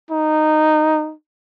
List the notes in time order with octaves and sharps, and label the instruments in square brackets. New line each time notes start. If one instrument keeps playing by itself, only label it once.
[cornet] D#4